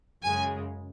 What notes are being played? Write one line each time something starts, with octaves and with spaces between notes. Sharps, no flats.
F#2 C#3 G#3 G#5